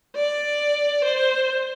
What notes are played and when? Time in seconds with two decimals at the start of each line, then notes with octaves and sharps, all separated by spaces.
0.16 D5
1.04 C5